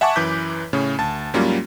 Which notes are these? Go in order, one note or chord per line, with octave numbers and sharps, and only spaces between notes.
E5 F#5 G#5 A5 C#6 D6
F#2 E3 B4 D6 G6 B6
A2 C#3 C#4
D2 A5 A6
G#2 F#3 G3 A#3 C#4 F4